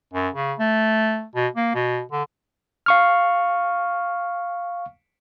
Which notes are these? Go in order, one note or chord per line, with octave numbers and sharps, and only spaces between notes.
F#2
C#3
A3
B2
A#3
B2
D3
F5 C#6 F6